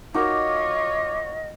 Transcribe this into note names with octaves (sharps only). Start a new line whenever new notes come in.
D#4 F4 F#4 A#4 C#5 D#5 D6